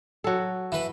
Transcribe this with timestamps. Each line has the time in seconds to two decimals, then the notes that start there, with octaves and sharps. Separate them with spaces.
0.24 F#3 A4
0.72 E3 B4